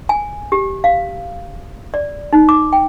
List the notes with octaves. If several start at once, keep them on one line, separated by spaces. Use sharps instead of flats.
G#5
G4
F5
D5
D#4
D6
G5